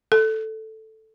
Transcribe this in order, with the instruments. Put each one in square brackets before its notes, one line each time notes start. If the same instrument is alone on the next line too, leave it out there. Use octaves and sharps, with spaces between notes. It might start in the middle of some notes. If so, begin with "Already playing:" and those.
[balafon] A4